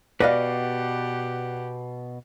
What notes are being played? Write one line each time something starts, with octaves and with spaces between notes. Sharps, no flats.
B2 G4 B4 D5 D#5 F5 F#5